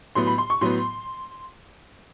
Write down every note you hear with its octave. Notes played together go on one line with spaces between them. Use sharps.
A2 F#3 B3 C6
B5
C6
C#6
A2 F#3 B3 C6